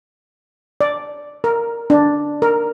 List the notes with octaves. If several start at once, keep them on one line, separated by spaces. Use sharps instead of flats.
D5
A#4
D4
A#4